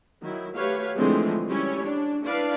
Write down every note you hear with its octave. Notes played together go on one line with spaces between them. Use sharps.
D#3 F#3 E4
A3 F#4 G4 B4 C#5 F5
D3 E3 F3 G#3 A3 C4
G3 C#4 E4 C#5
D4
D4 E4 B4 D5 F5